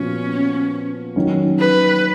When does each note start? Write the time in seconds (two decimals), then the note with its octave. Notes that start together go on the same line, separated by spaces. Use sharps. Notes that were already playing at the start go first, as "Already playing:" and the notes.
Already playing: A#2 F3 B3 C#4 F#4
1.16 D#3 F#3 C#4
1.60 B4